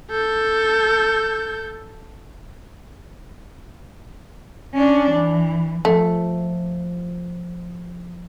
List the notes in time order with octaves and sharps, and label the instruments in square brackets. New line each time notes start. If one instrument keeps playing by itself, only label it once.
[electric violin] A4 G6
[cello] C#4 D4
E3
[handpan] F3 [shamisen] A3